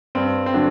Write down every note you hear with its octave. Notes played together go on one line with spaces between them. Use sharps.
G2 C4
C4
D3 F#3 D4